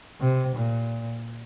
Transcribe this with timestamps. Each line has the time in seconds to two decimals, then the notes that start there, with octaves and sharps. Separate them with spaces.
0.21 C3
0.55 A#2